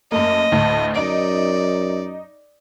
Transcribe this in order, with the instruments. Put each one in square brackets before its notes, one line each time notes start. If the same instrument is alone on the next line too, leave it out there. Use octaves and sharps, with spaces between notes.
[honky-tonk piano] F#2 A3 A#3 [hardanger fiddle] D#5
[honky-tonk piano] D2 A2 A3
[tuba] F#2 [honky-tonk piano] D#4 D7 [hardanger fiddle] D5